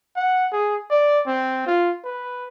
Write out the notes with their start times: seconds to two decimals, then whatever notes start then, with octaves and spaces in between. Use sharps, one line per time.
0.16 F#5
0.52 G#4
0.90 D5
1.26 C4
1.67 F4
2.04 B4